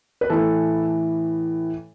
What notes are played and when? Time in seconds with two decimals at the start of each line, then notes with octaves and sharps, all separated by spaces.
0.21 B4
0.30 A2 E3 A4